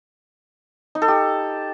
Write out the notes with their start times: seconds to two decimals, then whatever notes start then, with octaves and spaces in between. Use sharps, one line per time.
0.95 D#4
1.02 A4
1.08 G4